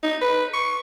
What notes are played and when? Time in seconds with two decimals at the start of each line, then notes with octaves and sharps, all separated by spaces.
0.03 D#4
0.22 B4
0.54 C#6